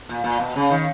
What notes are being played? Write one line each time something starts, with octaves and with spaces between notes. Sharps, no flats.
A#2
A#2
B2
C#3
D#3